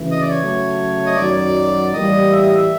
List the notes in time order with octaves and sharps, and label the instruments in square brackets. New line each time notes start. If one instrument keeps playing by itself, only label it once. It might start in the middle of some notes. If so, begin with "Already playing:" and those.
Already playing: [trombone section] D2 C#3 E3
[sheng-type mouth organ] D#5
D5
C#5
[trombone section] C#3 F#3 A3
[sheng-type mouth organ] D#5
[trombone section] F#2 D#3 F#3 [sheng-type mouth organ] D5
[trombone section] A2 E3 G3 A#3 [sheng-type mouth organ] D#5
[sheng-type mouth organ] E5
D#5
E5